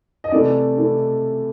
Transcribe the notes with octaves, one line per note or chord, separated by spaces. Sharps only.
D#5
C3 E3 A3 D5
C3 E3 A3